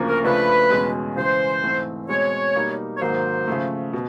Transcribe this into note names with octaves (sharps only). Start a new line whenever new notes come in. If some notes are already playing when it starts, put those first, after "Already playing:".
Already playing: D2 C#3 F3 A#3
A#4
C#3 F3 A3 D4 B4
E2 B2 G#3 C#4
C#3 E3 G#3 C5
G#2 E3 A3 C4
B2 G#3 C4 C#5
B2 G3 A#3 D#4
C#5
G#2 D#3 F#3 A#3 C5
C#3 F3 A3
B2